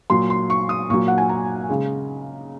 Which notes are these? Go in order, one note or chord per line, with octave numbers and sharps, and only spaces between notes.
A#2 F#3 C6
C6
C#6
D#6
A#2 F#3 C#6
F#5
G#5
A#5
C#3 G#3